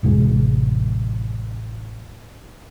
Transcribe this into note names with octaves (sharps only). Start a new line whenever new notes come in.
A1 F2 C3 G#3